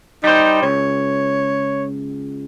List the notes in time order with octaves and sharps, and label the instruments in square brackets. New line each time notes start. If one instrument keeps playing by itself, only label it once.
[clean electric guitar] G3 C5 [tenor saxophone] D#4
[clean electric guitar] C#2 [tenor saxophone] C#5